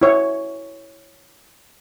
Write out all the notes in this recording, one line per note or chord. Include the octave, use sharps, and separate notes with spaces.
E4 C#5